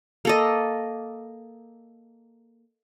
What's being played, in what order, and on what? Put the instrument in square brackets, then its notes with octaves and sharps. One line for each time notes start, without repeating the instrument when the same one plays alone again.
[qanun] A#3 A4 D#5